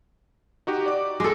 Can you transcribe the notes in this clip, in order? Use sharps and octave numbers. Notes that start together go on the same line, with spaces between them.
D#4 F#4 G4
D5 D6
G#3 A4 D6